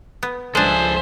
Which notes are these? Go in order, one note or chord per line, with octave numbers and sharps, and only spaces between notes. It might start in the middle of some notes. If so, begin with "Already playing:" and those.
B3
C#2 F3 G#3 D4 A4 C5 E5 G#5